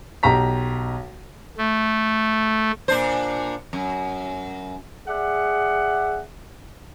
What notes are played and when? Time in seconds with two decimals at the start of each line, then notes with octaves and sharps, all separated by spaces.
0.23 B1 G4 A#5 B6
1.58 A3
2.88 A#2 D4 C5
3.73 F#2
5.08 G#4 D5 E5 F#5